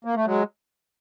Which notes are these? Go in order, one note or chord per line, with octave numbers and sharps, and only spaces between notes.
A#3
A3
F#3 G#3